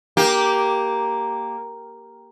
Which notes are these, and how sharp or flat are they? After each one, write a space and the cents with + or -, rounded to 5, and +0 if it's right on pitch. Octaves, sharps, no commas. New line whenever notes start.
A#3 +0 G4 +0